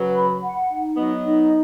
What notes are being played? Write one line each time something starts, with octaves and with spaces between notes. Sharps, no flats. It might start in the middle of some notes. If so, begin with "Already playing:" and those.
Already playing: C#3 F#3 B4
B5
F#5
D#4
F#3 B3 D#5
D#4